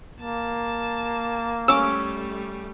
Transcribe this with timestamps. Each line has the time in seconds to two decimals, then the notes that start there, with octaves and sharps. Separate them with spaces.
0.21 A#3 A5
1.68 G3 A3 C#4 D6 E6